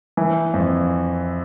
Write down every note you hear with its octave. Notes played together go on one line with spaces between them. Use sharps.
E3
F2